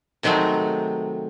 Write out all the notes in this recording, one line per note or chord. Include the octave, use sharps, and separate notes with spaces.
C3 D#3 F#3 G#3 A3